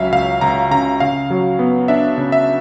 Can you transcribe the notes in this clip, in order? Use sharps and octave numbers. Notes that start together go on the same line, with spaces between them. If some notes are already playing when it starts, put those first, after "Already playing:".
Already playing: C#2 C#3 F#3 E5 F5
C#2 F5
C#2 A#5
C#3 A#5
C#3 F5
F#3
B3
D4 E5
C#3
E5